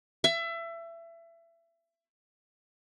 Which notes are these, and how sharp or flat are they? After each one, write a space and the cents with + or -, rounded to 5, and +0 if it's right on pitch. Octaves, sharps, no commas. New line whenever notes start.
E5 +25